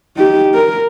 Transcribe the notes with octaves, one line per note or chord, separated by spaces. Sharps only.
D#4 G4
A#4